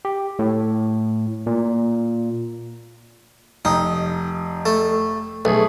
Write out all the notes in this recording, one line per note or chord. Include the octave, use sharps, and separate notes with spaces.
G4
A2
A#2
F1 D#4
A3
B1 A3 G#4